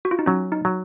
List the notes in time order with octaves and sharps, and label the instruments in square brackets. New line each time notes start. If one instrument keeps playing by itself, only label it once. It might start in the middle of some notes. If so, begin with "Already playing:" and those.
[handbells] F#4
F4
D#4
[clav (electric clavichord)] F#3 [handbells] C#4
[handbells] D#4
[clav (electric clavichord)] F#3